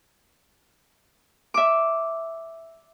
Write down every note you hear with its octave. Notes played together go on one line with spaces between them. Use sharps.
E5 D6